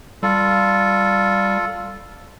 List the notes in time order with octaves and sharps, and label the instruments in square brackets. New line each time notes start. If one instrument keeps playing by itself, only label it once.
[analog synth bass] G3 [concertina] F4 A4